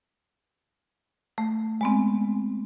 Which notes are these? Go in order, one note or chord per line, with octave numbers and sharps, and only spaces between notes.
A3
G#3 B3 C4